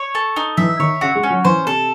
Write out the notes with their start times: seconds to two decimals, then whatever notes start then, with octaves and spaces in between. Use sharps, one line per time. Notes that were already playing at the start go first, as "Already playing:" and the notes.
Already playing: C#5
0.15 A4
0.36 D#4
0.57 E3 E5
0.79 D#3 C#5
1.01 C#3 F#4
1.15 G#3
1.23 C#4
1.30 F#3
1.45 E3 C5
1.66 C3 A4